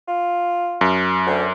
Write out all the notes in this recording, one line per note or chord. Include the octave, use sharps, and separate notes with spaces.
F4
F#2
D2